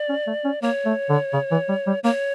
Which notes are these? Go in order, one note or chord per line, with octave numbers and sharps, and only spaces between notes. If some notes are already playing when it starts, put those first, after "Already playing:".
Already playing: D5
C#4
A3
C#4
A#3 C#5
A3
D3
C#3
E3
G3
G3
A#3 C#5